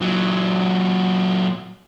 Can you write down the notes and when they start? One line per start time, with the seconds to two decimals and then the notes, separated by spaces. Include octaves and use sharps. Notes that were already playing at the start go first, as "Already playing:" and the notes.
0.01 A#2 F#3